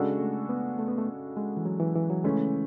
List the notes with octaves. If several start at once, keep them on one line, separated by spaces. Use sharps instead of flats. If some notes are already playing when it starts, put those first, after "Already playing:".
Already playing: C#3 G#3 D4 F#4 A4
A3
B3
A3
B3
A3
G#3
E3
F#3
E3
E3
F#3
C#3 E3 G#3 A3 C#4